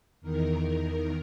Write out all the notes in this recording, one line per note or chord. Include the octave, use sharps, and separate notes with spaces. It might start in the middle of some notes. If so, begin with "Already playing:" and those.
E2 D#3 A#4